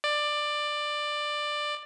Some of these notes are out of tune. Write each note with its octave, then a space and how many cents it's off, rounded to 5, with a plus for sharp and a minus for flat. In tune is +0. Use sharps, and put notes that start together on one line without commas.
D5 +15